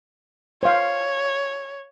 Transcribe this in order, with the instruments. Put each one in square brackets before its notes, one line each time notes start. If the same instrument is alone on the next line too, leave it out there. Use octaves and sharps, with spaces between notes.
[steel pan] C5 F5 [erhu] C#5